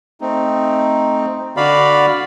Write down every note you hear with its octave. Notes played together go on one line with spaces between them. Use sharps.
A3 C4 D#4
D3 F#4 D5 F5 B5